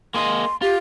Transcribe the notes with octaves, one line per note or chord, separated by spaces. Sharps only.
A#3 G#4 D#5 C6
F4 G4